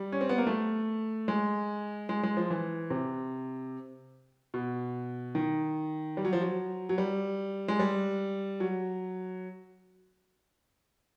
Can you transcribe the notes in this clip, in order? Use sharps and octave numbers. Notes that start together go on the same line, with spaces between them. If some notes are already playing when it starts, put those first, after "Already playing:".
Already playing: G3
C#4
C4
B3
A#3
A3
G#3
G#3
G#3
F3
E3
C3
B2
D#3
G3
F#3
F3
F#3
F#3
G3
G#3
G3
F#3